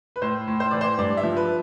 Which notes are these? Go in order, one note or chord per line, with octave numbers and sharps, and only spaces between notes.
B4
A2 C5
A2
C5
E3 D5
C5
G2 D5
E5
F3
B4